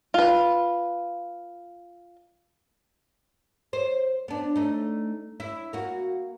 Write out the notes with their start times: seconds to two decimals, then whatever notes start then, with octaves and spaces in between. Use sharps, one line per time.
0.14 F4 B4
3.73 C5
4.28 B3 D4
4.56 A3 D#4
5.40 E4
5.73 A#3 F#4